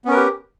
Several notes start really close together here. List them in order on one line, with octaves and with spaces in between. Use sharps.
B3 C#4 A#4 B4 G4